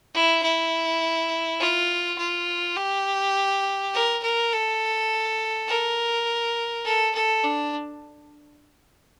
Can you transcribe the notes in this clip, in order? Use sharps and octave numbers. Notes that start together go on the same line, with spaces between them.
E4
E4
F4
F4
G4
A#4
A#4
A4
A#4
A4
A4
D4